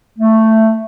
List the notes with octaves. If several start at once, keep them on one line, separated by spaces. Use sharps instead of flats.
A3